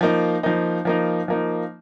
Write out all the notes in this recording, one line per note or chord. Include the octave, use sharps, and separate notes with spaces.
F3 A#3 D#4
F3 A#3 D#4
F3 A#3 D#4
F3 A#3 D#4